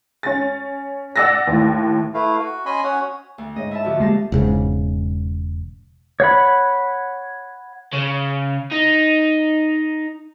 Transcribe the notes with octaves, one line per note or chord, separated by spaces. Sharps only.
C#4 A6
D5 F#5 E6 A6 A#6
D#2 A2
A3 E4 B4 F5
F#4
C#4 D#5 G#5 B5 C6
C#4 F#4 C#5 F#5 D#6
D2
G#2 C#5 D#5
E4 E5 A5
D3 F3 F4 F#4
G#3 A#3 G4 A5
E1 G#2 C#3
C#5 F#5 B5
C#3
D#4